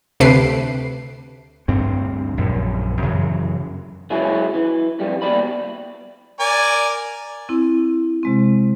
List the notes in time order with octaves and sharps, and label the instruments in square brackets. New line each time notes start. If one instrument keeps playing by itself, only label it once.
[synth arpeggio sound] D2 C3 A3 B4 C7 D7
[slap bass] D2 G2 C4
A#1 F#2
F#2 C#3 E3 F#3
[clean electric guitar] F#3 G#3 C#4 E4
E3
F2 G3
D#2 B2 G3 D5 B5
[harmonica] A#4 D5 G#5
[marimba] C4 E4
C3 G#3 C4